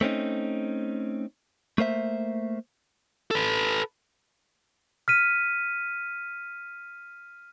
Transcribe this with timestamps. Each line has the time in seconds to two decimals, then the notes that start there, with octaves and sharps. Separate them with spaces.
0.01 A3 C4 C#4 D#4
1.78 A3 A#3 C5 E5
3.31 A4 B4
5.08 F6 B6 D#7